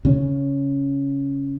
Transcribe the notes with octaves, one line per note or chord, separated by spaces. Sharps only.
C#3 C#4